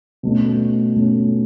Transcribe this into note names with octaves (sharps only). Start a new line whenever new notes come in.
B2 A3 C#4
B2 A3 C#4